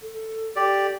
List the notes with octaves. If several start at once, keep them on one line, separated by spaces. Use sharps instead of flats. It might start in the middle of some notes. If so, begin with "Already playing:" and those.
A4
G4 D5